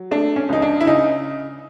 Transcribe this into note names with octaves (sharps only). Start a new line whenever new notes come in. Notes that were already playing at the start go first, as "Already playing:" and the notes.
Already playing: F#3
A3 D4
C#4
C#2 D#4
D4
E4
C#3 D#4